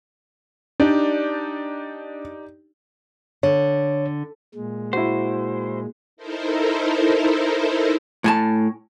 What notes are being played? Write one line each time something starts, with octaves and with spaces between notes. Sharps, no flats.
D4 D#4 G4 D5
D3 C#5
A#2 G#3
E4 F#4 C5
D#4 E4 A4 A#4 C5
A2 G#5 A5